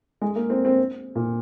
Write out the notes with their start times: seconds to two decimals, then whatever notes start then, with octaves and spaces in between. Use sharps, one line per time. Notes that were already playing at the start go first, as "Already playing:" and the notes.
0.21 G#3
0.36 A#3
0.50 C4
0.65 C4
1.15 A#2